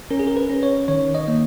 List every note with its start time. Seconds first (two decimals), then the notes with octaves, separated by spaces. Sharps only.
0.10 C#4 A#4
0.19 G#4
0.27 A#4
0.37 B4
0.49 C#4
0.63 C#5
0.88 D#3 C#5
1.15 D#5
1.28 A#3